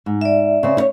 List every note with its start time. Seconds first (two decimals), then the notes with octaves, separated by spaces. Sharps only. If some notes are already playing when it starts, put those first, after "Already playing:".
0.06 G#2
0.21 D5 E5
0.63 C#3 C4
0.77 E4 C#5